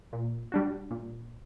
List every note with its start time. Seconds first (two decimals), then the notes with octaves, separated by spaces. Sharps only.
0.13 A#2
0.52 G3 D4 F#4
0.91 A#2